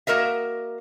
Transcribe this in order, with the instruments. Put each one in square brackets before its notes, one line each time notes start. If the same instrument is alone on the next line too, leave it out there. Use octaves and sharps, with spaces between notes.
[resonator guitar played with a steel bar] A#3 F#4 A#4 D#5 E5